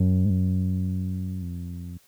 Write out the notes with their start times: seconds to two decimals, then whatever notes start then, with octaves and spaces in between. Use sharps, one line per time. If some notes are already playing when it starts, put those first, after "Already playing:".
Already playing: F#2
0.25 G#2
0.30 F#2
1.42 F2